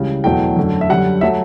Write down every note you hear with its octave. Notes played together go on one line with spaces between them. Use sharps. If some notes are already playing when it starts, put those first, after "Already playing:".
Already playing: C#2 C#3 E3 G3
E2 B2 F#3 A3 G5
F#2 D3 A3
E5
F#2 D3 G3 F#5
F#3 A3 E5